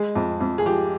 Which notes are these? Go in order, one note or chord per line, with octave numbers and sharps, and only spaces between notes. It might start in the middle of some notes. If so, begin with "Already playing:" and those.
Already playing: G#3 G#4
F2
F2
G#4
F3 G4